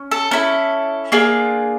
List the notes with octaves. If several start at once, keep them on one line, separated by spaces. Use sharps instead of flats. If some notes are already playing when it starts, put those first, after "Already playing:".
Already playing: C#4
A4
C#4 E4 A4 A#4
A#3 D4 F4 G#4